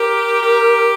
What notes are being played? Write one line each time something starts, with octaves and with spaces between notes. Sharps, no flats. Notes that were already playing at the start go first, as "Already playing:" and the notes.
Already playing: G4 A#4
G4